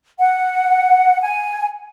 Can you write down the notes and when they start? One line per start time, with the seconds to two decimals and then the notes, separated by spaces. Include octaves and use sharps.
0.19 F#5
1.21 G#5